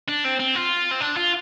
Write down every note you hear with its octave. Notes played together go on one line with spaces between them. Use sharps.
D4
C4
C4
F4
C4
D4
F4